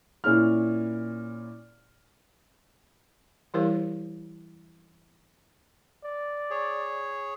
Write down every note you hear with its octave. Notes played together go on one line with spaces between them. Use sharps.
A#2 C#4 E4 F6
E3 G3 E4 G4 A#4 C5
D5
G#4 C#5